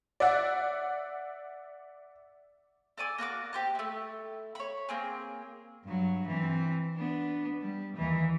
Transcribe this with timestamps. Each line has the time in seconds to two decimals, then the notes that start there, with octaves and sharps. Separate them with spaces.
0.20 D5 E5 F#5
2.98 A4 D5 G#5 D6
3.18 A#3 F#4 A#5 D6
3.53 G4 C5 A5
3.75 A3 E4
4.55 C#5 B5
4.89 A#3 C4 G#4
5.85 G2 F#3
6.27 E3 C4
6.97 B3 D4
7.61 G3
7.96 D#2 E3